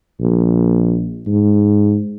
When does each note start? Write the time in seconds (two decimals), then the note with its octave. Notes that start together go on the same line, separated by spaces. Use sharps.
0.20 A#1
1.27 G#2